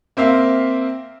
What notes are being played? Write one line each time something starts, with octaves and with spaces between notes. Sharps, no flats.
A#3 C4 E5 F5